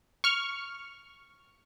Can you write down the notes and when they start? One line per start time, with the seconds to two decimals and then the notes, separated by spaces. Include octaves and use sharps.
0.24 C#6 F6